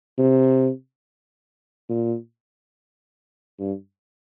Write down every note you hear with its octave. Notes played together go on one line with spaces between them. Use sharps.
C3
A#2
G2